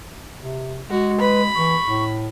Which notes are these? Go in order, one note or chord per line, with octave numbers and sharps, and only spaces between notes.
C3
G#3 F#4
B4 B5
E3 C#6
A2